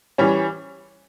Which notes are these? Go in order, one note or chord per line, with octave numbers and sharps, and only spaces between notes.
E3 G3 C#4